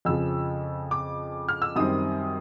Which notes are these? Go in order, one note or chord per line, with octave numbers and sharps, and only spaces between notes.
F2 C#3 F3 E6
D6
F6
E6
F#2 D#3 G3 C4 D#6